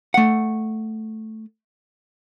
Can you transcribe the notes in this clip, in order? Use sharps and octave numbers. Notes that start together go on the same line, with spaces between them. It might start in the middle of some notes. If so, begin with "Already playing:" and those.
A3 F#5